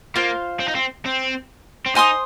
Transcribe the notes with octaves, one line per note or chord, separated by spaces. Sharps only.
A#3 F4 C5 F5
C4
D#4
C4
C4
C4
D#4 C5 G#5 C6 D#6